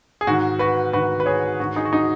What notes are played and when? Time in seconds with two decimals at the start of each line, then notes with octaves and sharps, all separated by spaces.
0.21 G#4
0.27 G#2 D#3 F#4
0.59 F#4 B4
0.93 G#2 D#3 F#4 B4
1.20 B4
1.26 G#4 C#5
1.60 G#2 D#3 F#4
1.76 D#4 G#4
1.85 F#4
1.93 D#4